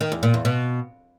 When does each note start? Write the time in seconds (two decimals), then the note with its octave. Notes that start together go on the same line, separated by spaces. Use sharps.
0.01 D#3
0.12 E2
0.23 A#2
0.34 E2
0.45 B2